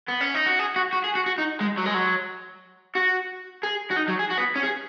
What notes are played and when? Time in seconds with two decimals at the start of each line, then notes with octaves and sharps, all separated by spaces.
0.08 B3
0.20 C#4
0.34 D#4
0.46 F#4
0.59 G#4
0.76 F#4
0.93 F#4
1.04 G#4
1.15 F#4
1.26 F#4
1.38 D#4
1.60 G#3
1.77 F#3
1.86 G#3
1.94 F#3
2.95 F#4
3.63 G#4
3.91 F#4
3.96 D#4
4.08 F#3
4.19 G#4
4.30 F#4
4.38 B3
4.56 C#4
4.63 G#4